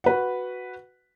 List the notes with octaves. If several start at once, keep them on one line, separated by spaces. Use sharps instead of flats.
F#4 B4 F#5